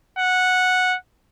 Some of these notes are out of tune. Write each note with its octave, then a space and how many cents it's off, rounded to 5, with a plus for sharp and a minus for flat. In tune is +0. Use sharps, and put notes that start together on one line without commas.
F#5 -10